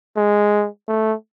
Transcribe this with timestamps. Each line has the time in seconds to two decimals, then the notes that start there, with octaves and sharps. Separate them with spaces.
0.16 G#3
0.88 A3